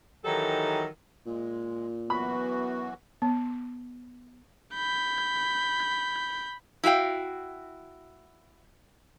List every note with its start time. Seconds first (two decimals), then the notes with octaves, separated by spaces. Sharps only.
0.24 D#3 E3 F#3 D#4 G4 A4
1.26 A#2 G#3
2.10 F#2 E3 B3 F#4 B5
3.22 B3
4.74 B5 G6
6.84 E4 F#4 F5 G5